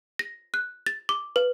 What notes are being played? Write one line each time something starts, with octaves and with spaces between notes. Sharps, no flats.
A#6
F#6
A6
D6
B4